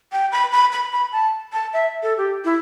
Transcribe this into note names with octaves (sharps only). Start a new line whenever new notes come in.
G5
B5
B5
B5
B5
A5
A5
E5
A4
G4
E4